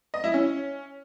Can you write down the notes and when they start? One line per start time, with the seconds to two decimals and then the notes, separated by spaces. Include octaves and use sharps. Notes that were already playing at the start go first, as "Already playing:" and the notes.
0.14 D#5
0.24 E4
0.34 C#4